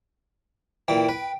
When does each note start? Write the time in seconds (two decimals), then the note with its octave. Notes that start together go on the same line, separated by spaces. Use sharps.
0.88 A#2 E3 G5
1.09 B4